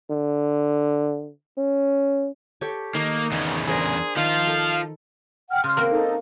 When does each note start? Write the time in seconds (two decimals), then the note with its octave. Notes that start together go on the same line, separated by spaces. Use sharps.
0.10 D3
1.58 C#4
2.61 G4 A4 C#5
2.95 D#3 A#3 D#4
3.32 E2 C#3
3.67 D4 G#4 A#4 C5
4.17 D#3 F3 F4 F5
4.47 A4
5.50 F#5 G5 F6
5.64 C#3 C6 F6
5.77 A#3 C4 F#4
5.91 D#4 A4